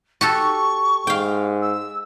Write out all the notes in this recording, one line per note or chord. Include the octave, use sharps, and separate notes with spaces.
F#4 G4 A4 C#6
G#2 F5 G5
E6